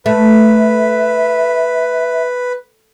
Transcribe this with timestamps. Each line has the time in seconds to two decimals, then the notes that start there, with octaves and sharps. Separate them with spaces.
0.06 A3 B4 E5